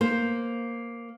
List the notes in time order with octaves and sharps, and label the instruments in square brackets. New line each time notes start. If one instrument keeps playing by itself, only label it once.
[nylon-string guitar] A#3 C5